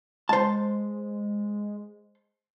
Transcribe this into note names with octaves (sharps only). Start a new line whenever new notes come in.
G#3 C5 A5